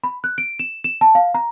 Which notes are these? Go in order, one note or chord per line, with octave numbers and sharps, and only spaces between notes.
B5
F#6
D7
E7
E7
A5
F5
A#5